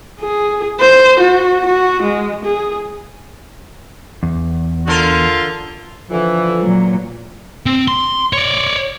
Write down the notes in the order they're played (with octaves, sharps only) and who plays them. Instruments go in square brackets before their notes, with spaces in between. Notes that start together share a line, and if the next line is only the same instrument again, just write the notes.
[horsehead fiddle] G#4
C5
F#4
F#4
G#3
G#4
[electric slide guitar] E2
[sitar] D3 A#4 [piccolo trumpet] F4
[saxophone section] D3 E3 [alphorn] F3
[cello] A#2 F#3
[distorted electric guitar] C4
C6
C#5 D5